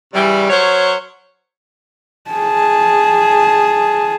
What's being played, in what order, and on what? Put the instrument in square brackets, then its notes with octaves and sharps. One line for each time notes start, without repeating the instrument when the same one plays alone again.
[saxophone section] C#3 E3 G3
F#3 A#4 C5 C#5
[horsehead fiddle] G#4 A5